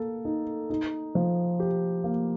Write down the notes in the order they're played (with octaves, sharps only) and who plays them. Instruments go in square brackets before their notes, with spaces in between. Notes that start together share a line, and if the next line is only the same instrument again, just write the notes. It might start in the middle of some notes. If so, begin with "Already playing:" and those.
Already playing: [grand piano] A#3 A4
D#4
D#4
F3
G4
A#3